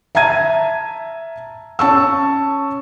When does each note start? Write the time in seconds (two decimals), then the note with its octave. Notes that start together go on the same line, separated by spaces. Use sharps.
0.15 E5 A5 A#5 G#6 D#7
1.79 C#4 A5 C#6 E6